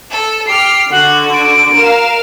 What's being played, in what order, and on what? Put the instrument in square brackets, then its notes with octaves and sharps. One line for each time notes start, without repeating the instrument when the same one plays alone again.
[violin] A4
[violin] G4 F6 [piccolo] C7
[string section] D3 [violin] F#4 [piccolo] F#5
[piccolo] D7
[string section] A#4 F5 [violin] E7